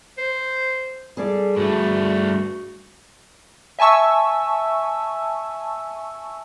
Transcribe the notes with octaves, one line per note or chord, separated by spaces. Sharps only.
C5
G3 G#4 A4 D5
G2 A3 F#4
E5 G#5 A5 C#6 E6